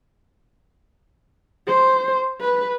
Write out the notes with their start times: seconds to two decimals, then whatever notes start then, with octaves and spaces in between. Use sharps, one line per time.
1.67 C5
2.41 B4